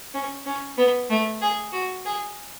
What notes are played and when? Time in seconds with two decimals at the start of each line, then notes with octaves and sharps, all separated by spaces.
0.14 C#4
0.46 C#4
0.78 B3
1.10 A3
1.41 G#4
1.73 F#4
2.05 G#4